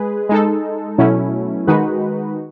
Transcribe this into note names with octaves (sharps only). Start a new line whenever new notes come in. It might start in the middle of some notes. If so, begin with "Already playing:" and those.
Already playing: G#3 G#4 B4
G#3 D#4 A4
B2 F#3 A3 C#4 E4
D#3 G#3 D#4 F#4 B4